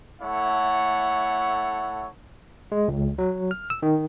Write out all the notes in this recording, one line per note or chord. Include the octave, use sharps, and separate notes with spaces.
A3 E4 A4 C#5 F#5
G#3
C#2
F#3
F6
E6
D#3